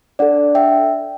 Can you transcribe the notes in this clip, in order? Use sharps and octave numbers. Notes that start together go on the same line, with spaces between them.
D4 A4 D5 F#5
E5 G5